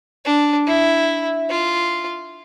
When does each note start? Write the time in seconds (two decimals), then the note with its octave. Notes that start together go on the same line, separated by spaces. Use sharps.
0.25 D4
0.67 E4
1.49 F4